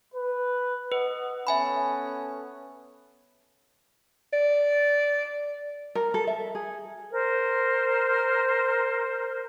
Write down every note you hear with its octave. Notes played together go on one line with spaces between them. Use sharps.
B4
B4 D#5 F#5
B3 C#4 A4 E5 G#5 B5
D5
A#4
A4
E5
G#4
A#4 C5